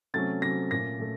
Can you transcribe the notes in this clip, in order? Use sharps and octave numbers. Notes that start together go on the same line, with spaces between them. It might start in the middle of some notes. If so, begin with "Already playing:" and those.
C3 F#3 A3 C#4 A6
C3 F#3 A3 C#4 A#6
A#2 A3 C#4 A#6
A#2 A3